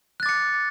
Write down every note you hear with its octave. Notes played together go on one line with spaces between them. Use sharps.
D6 F#6 A6 C#7